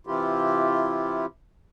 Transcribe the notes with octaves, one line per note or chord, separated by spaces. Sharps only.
C3 E3 E4 F4 G4